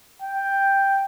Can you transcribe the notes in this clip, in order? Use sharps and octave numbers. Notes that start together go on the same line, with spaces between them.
G5